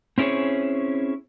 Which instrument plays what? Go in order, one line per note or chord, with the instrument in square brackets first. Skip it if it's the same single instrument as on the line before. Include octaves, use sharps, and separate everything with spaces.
[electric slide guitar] C4 C#4 E4 G#4 C5 C#5